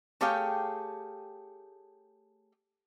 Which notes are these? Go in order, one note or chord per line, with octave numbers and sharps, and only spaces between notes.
A3 G4 G#4 C#5 F5 G5